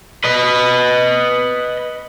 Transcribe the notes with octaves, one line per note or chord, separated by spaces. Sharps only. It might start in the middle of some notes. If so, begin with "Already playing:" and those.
B4 D#5